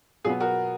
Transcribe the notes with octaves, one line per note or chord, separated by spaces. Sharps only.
B2 F#3 B3 F4 G#4
F#4 A#4